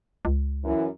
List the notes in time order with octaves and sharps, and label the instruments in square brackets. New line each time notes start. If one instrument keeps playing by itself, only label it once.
[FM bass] C#2
[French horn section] F#2 E3